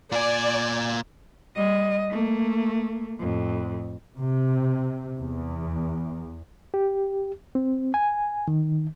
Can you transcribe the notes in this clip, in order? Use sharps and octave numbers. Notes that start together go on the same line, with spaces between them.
A#2 D5 G#5
G3 D#5
A3 A#3
F2 A2
C3
E2
G4
C4
G#5
D#3